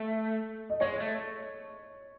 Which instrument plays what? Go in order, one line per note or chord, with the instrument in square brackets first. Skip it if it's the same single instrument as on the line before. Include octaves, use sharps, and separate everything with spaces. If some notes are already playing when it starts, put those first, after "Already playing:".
Already playing: [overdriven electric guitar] A3
[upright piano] D#5
[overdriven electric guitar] G#3 [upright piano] C#5
[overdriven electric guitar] A3